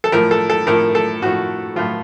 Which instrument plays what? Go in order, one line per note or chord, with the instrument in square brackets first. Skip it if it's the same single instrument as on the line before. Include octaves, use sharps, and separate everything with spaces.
[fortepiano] A4
A2 F3 A#4
A4
A4
A2 F3 A#4
A4
A2 F3 F#4
A2 F3 F4